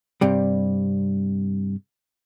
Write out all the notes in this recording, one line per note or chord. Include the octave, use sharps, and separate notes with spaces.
G2 C3 G3